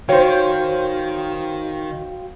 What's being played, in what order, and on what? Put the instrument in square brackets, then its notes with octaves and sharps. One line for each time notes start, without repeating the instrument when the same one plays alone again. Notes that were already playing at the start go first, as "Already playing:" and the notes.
[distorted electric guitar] D#3 [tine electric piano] F#4 F5 G5 [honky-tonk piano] C5 C#5